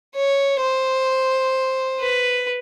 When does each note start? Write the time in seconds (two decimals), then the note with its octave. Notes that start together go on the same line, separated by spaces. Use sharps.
0.15 C#5
0.61 C5
2.00 B4